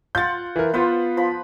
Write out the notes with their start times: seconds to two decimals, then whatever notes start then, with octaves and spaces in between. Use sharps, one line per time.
0.15 F4 F#5 G6 A6
0.56 E3 A#4
0.74 B3 F4 B4 C5 F#5
1.17 F3 B5